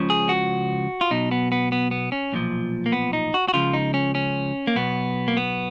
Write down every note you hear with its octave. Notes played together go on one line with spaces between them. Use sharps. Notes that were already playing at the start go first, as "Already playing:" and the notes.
Already playing: C#2 C#3 F3
G#4
F#4
F4
B1 B2 D#4
B3
B3
B3
B3
C#4
B1 A#2 F3
A#3
B3
D#4
F#4
F#4
C#2 C#3 F3 F4
D#4
C#4
C#4
A#3
B1 B2 B3
A#3
B3